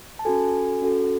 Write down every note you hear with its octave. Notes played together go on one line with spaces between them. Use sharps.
A5
C#4 F#4 A4 G#5
C#4 F#4 A4